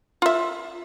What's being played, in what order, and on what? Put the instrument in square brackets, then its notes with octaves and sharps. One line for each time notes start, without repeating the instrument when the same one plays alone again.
[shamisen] F4 E5